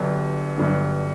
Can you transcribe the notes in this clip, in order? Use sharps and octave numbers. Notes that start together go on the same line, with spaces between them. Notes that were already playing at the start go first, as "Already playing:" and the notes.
Already playing: G1 G2 D3 F#3
G1 G2 D3 F#3